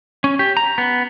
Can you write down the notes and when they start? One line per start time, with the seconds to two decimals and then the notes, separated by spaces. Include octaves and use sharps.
0.24 C#4
0.39 G4
0.57 A#5
0.78 B3